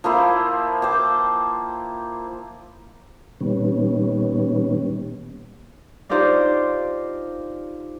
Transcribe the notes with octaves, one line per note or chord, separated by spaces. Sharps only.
F3 A#3 E4 C5
C5 G5 D6
A#2 D#3 G3 B3 C#4
D4 D#4 F4 G4 C5 D5